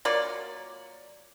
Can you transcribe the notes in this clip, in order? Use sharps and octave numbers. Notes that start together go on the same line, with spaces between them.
F#3 A#3 F4 D5